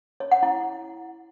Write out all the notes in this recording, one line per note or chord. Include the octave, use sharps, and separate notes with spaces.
C#5
F#5
E4